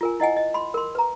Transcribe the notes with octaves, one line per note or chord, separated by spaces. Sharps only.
F4 A#4 G#5
E4 D#5 F#5 G#5
D#5
B5 C6
A#4 C6
B4 A#5